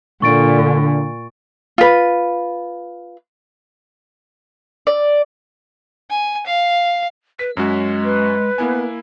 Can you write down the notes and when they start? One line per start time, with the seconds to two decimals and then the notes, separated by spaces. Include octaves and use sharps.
0.22 A#2 D3 C#6 A6 D7
1.78 F4 B4
4.87 D5
6.10 G#5
6.47 F5
7.39 B4 B6
7.57 F#2 G#3 C#4 F#4
8.04 B4
8.58 A#3 B3 E4 G#5